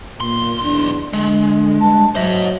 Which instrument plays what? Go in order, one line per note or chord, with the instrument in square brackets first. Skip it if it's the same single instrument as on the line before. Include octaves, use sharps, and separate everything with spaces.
[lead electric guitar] B1 C6 [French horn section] A#2
[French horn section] E2 D4
[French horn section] D3 [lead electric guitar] G#3
[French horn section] G2 [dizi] A5
[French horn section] F#3 [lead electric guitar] C5 D#5 [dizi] E5